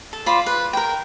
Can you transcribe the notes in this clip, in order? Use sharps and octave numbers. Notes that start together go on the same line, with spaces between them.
A4
F4 C5 D5 B5
B4
A#4 G5